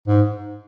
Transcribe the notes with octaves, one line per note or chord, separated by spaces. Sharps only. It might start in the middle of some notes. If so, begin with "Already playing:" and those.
G#2